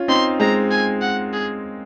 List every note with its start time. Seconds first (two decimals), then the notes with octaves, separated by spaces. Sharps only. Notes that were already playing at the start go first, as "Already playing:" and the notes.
Already playing: C#4 F4
0.08 C4 D#4 C6
0.40 G#3 C4 A#5
0.71 G#5
1.02 F#5
1.33 G#4